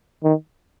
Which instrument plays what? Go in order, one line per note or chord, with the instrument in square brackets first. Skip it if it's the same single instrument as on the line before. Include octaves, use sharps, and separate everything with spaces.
[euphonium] D#3